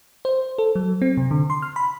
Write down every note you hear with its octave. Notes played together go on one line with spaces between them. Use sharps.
C5
A4
F#3
C4
C3
D3
C6
F6
B5